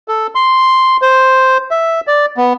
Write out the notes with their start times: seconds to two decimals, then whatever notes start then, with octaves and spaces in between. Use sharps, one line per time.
0.08 A4
0.35 C6
1.02 C5
1.71 E5
2.07 D5
2.37 B3